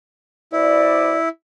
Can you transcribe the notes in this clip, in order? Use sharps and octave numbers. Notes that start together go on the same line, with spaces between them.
B2 E4 C5 D5